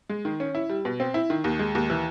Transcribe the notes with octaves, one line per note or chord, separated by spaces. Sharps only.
G#3
D#3
C#4
E4
G3
B2
C4
E4
D#3
D#2
G#3
D#2
E3